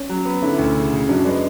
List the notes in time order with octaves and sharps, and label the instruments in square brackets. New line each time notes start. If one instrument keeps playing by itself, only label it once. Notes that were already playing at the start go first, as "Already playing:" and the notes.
Already playing: [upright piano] C#4
[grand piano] F#3
B3
[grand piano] D3 [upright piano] C#4 E4
[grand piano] D2
C#3
C#3
[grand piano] F#2 [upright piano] D4 F#4
[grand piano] G#3 [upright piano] B4 D5